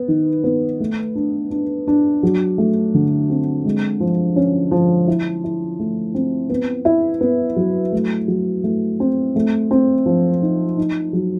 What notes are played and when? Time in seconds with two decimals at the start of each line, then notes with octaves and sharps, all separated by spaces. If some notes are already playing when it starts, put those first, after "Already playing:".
Already playing: B3
0.08 D#3
0.44 B3
0.80 A3
1.15 D4
1.51 D4
1.87 D4
2.23 F#3
2.58 A3
2.94 D3
3.29 C4
3.65 G#3
4.00 F3
4.36 C#4
4.71 F3
5.07 E4
5.44 E4
5.79 A3
6.15 C4
6.49 B3
6.85 E4
7.21 B3
7.56 F#3
7.92 A3
8.28 F#3
8.64 A3
9.00 C4
9.36 A3
9.71 C4
10.06 F3
10.42 D#4
10.77 D#4
11.13 F#3